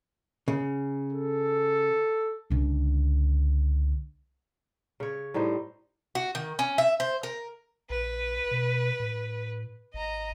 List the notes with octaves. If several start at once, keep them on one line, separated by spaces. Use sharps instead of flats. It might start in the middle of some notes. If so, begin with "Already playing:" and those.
C#3
A4
C#2 D3
C#3 C#5
A2 G3 D#4 C5
F#4
D#3
C#4
E5
C5
A#4
A#1 B4
B2
A2
G#1 D#5 A#5